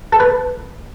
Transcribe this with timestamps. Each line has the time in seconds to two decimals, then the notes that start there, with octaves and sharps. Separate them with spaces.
0.13 A4
0.20 B4